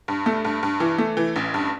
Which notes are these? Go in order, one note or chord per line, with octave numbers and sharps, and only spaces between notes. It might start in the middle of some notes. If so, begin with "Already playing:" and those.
G2
A3
G2
G2
E3
A3
E3
A1
G2